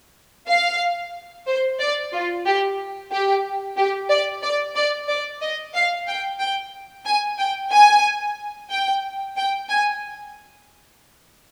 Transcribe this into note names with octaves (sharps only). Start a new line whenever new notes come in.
F5
C5
D5
F4
G4
G4
G4
D5
D5
D5
D5
D#5
F5
G5
G5
G#5
G5
G#5
G5
G5
G#5